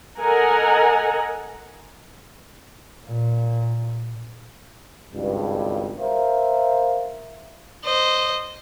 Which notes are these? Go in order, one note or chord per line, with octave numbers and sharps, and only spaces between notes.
A4 A#4 D#5 F#5 G#5 A#5
A#2
G#1 C#2 G2
A#4 C5 E5 F5
C5 D#5